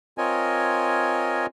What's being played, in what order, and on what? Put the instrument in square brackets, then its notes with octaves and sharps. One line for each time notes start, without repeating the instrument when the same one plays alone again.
[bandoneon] C4 F4 A#4 C#5 D#5 G#5